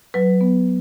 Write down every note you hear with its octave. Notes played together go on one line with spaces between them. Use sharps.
F#3 B4
B3